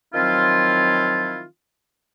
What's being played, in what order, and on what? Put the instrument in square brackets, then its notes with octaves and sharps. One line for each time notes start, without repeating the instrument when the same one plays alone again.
[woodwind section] D#3 F3 F#3 C4 E4 F4